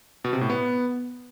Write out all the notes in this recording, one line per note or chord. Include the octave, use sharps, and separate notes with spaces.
B2
C3
A2
B3